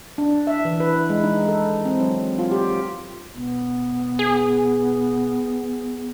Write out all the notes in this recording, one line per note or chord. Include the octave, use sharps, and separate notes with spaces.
D4
E5
E3
B4
G#3
D#4
A4
C4
F#3
F4
G4
E1 B3
G#4